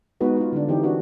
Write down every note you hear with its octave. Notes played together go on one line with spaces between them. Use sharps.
G#3 B3 D#4 F#4 B4
F4 F#4
D3 G3 D4
E3 C4 D#4 G4
D4 F#4 A#4